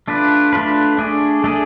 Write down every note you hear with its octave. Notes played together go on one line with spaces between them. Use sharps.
A3 D4 F4 B4
A3 D4 F4 B4
A3 D4 G#4
A3 D4 G#4